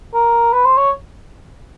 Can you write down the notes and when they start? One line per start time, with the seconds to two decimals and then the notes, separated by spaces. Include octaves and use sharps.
0.14 A#4
0.52 B4
0.65 C5
0.77 C#5